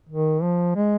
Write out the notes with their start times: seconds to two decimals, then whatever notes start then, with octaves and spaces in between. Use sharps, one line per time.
0.09 D#3
0.43 F3
0.76 G#3